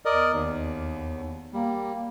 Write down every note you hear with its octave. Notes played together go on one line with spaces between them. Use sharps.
E2 A#4 D5 D#5
D#2
G3 A#3